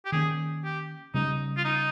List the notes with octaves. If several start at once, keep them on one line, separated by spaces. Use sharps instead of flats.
G4
D#3 A#3 C#4 G#4
G4
C#3 G3 C#4 D#4
F4
D#4